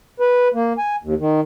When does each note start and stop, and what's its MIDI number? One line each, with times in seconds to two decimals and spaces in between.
0.20 0.48 71
0.54 0.73 58
0.78 0.96 80
1.03 1.14 39
1.20 1.41 51